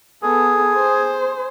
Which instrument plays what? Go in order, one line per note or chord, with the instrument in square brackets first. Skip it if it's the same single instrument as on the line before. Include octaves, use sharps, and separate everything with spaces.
[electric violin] B3 A4 [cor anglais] G#4
[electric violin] C5